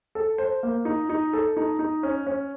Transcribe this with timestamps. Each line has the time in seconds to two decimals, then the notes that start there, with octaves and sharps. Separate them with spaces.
0.15 A4
0.38 C5
0.63 A#3
0.85 D#4
1.09 D#4
1.33 A4
1.57 D#4
1.79 D#4
2.03 C#4
2.27 C#4